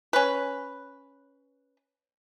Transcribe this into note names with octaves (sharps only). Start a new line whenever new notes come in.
C#4 B4